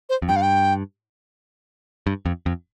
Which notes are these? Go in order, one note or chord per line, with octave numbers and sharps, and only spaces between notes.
C5
F2
G2 G5
F5
G5
G2
F2
F2